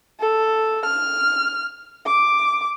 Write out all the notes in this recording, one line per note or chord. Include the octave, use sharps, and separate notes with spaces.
A4
F6
D6